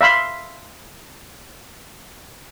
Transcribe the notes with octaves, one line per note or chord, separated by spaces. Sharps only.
E5 F5 B5 C6